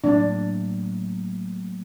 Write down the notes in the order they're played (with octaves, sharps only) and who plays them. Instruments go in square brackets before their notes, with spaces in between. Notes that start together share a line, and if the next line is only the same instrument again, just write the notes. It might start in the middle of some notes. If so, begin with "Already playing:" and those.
[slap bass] A2 F#3 A#3 [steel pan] D4